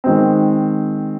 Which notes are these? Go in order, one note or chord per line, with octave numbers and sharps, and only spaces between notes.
D#3 G#3 C4